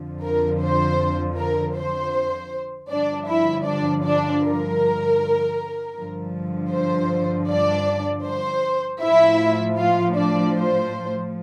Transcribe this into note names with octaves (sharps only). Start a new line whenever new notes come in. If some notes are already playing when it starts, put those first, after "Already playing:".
Already playing: F2 D3 F3
A#4
C5
A#4
C5
G2 D3 F3 D4 D5
E4 E5
D4 D5
D4 D5
A#4
G2 D3 F3
C5
D4 D5
C5
A2 F3 E4 E5
F4 F5
D4 D5
C5